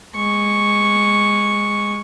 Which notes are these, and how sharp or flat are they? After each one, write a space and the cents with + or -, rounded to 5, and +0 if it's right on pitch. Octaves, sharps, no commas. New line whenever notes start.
G#3 -15 C#6 +0